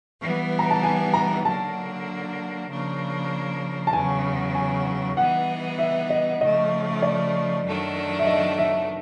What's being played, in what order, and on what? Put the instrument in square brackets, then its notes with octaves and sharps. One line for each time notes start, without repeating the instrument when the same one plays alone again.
[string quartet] E3 G3 B3
[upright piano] A#5
A5
G#5
A#5
[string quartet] D3 F#3 A#3 D4 [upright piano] A5
[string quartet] C#3 F3 A#3 D4
[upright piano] A5
[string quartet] E2 C#3 F#3 [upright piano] G#5
[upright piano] G#5
[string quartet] E3 G3 B3 D#4 G#4 [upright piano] F#5
[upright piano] E5
D#5
[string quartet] C#3 F3 A3 [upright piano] D#5
[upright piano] D5
[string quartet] F#2 D#3 F#3 A3 D4
[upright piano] E5
D#5
E5